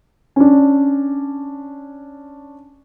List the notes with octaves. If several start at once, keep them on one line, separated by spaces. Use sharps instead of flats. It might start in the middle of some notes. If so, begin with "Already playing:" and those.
C#4 D4